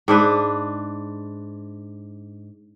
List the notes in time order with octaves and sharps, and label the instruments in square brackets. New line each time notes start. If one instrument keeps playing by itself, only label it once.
[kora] G#2 D4 B4